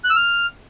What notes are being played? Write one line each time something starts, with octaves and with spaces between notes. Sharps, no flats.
F#6
E6
F6